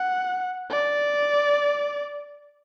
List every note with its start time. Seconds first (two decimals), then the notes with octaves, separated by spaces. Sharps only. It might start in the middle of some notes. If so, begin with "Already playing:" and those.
Already playing: F#5
0.71 D5